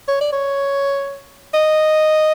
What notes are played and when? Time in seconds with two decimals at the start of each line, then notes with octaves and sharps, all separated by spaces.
0.08 C#5
0.21 D5
0.33 C#5
1.54 D#5